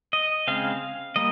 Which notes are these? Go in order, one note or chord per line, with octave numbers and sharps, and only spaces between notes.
D#5
C#3 G#3 C4 F5
G3 A#3 D#5